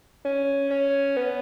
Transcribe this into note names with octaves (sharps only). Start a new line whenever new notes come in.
C#4
C#4
B3